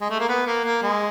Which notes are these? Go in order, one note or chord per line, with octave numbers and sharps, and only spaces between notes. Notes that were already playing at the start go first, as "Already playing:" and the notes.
G#3
A3
A#3
B3
A#3
A#3
G#3